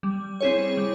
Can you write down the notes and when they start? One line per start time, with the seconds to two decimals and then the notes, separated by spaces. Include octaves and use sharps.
0.03 G3
0.41 C4 E4 G#4 C#5
0.77 G3